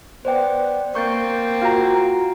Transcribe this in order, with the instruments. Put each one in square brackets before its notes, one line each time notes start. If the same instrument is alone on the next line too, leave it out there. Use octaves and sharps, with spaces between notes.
[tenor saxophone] B3 [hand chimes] C5 D5 G5
[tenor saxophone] A#3 [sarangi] C4 [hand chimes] C#6 G6 A6
[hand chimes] F4 F#4 [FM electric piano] F5 A#5